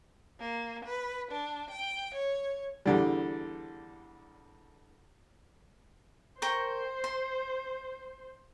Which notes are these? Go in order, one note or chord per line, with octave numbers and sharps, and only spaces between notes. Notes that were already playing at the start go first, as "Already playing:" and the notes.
A#3
B4
D4
G5
C#5
E2 D3 G3
A#4 C5 G5 C#6
C6